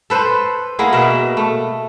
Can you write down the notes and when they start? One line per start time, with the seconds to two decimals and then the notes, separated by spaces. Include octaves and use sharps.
0.10 A4 B4 C5
0.79 A#3 B3 E4 G#4
0.93 B2 A#3 E5
1.37 A3